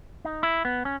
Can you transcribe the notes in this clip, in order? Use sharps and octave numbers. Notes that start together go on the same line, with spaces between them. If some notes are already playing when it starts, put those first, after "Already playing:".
D#4
E4
B3
C#4